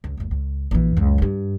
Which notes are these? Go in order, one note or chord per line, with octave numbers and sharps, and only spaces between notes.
C#2
F#1 C#2
C#2
A#1 E3
C#2 F#2
G2 E4